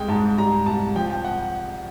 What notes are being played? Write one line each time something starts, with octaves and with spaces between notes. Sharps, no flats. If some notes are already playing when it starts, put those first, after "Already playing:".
Already playing: C2 G#3 G5
G#2 A5
G3 A#5
C2 A5
F3 G5
G5
F#5